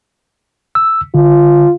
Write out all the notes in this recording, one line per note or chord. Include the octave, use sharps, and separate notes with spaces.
E6
D3 F4